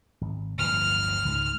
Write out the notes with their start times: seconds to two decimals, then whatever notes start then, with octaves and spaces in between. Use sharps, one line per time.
0.21 G#1
0.58 D1 G1 F3 F6
1.25 C#2 G#2